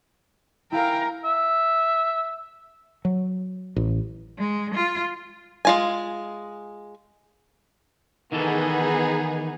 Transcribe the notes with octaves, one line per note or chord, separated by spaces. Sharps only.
E4 A#4 F5 G5 G#5 A#5
E5
F#3
A1
G#3
F4
G#3 F4 G#5
D#3 E3 B3 D#4 G#4 A4